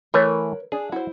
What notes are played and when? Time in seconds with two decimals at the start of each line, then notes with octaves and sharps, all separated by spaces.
0.14 E3 A3 A#4 B4 C#5
0.72 D4 G#4
0.92 E4 F#4 C5